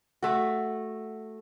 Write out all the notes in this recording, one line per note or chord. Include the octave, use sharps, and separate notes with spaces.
A3 F#4